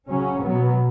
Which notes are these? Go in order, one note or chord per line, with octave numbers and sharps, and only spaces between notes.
C#3 F#3 C#4
B2 F#3 B3